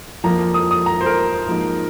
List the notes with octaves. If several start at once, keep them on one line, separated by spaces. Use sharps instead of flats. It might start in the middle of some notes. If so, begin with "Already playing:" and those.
F2 F3 A#3 A#5
D#6
D#6
A#5
C5
A#4
G#2 F3 A#3